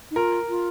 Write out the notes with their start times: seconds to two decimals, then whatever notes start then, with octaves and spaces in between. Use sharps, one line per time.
0.11 D#4
0.16 F4 A#4
0.49 F4